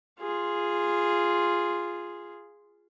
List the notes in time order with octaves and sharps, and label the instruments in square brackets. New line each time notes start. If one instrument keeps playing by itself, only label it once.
[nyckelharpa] F4 G#4